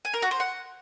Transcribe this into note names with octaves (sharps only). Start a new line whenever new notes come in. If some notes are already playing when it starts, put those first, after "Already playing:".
G#5
A#4
F#4
C5
F#5